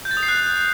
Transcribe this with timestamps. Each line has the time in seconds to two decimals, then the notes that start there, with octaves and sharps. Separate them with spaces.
0.05 G6
0.11 A6
0.17 D#6
0.23 C7
0.28 F#6